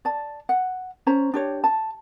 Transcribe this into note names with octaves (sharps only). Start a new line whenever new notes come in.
D5 A5
F#5
C#4 C5 A#5
D4 G4 C#5
A5